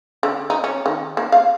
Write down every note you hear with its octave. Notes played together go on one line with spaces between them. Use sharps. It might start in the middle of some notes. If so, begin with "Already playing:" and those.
D3
D#4
C#4
D#3
A#3
F5